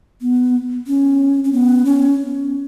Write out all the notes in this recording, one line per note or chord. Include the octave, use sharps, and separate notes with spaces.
B3
C#4
C#4
B3
C#4